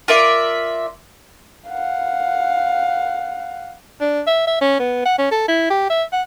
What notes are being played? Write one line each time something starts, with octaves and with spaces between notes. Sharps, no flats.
F4 A#4 D5 E5
F5 F#5
D4
E5
E5
C#4
B3
F#5
C#4
A4
E4
G4
E5
F#5